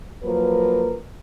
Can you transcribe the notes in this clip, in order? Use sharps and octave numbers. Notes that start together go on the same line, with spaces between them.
F3 F#3 A#3 A#4 B4